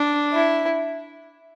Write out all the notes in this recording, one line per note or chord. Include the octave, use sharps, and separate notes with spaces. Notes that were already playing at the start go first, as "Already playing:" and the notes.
Already playing: D4
E4